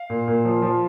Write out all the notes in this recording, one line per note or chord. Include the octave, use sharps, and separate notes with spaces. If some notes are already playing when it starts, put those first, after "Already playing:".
Already playing: F5
A#2
A#2
F3
F3